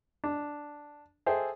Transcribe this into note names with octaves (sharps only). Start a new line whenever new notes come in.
D4
G#4 A4 C5 E5 G5